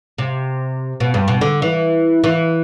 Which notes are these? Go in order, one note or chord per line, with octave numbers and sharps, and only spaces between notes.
C3
B2
G2
B2
D3
E3
E3